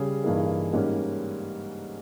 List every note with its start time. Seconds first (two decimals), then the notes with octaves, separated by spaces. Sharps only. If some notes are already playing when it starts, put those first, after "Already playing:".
Already playing: C#3 G3 C#4 G#4
0.24 G2 E3 A#3 D#4 G#4
0.73 G#2 G3 A#3 C#4